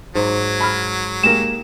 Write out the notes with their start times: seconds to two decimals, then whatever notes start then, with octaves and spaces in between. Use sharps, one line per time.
0.15 G#2 F#3
0.61 B5 F6
1.23 G#3 A#3 G4 A#4 E7